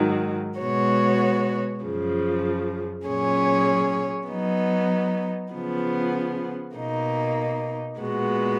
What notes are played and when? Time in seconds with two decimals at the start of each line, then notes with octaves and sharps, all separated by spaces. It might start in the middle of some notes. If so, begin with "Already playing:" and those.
Already playing: G#2 D#3 F#3
0.59 B2 G#3 B3 F#4 C#5
1.83 F#2 C#3 F3
3.06 A#2 F#3 C#4 G#4 C#5
4.29 F#3 B3 D#4
5.53 C#3 F3 B3
6.76 B2 A#3 D#4
7.99 A#2 G#3 B3 F#4